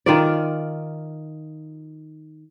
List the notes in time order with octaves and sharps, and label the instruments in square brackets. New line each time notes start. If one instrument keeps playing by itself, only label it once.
[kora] D#3 F4 D5